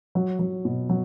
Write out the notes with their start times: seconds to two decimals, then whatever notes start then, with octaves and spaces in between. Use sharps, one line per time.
0.15 F#3
0.39 F#3
0.65 B2
0.90 F#3